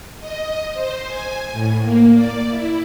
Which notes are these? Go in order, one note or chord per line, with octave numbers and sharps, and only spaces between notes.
D#5
C5
G#5
A2
A#3
D5
E4